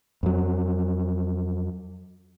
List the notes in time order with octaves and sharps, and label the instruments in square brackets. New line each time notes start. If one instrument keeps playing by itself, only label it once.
[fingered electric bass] F2 F#3